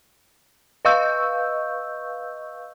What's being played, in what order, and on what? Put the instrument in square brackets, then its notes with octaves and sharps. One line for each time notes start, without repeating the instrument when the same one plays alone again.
[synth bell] B4 D#5 F5 C#6 E6 G6